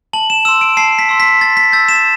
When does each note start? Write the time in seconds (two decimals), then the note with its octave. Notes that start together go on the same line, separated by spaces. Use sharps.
0.13 A5 F#7
0.30 E7
0.45 C6 E6 E7
0.61 D7
0.77 A5 C7
0.99 B6
1.09 C6 E6
1.20 B6
1.40 C6 A6
1.57 B6
1.72 E6 G6 A6
1.89 E7